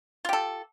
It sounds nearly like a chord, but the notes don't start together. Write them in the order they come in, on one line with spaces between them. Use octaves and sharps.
F4 G4 A4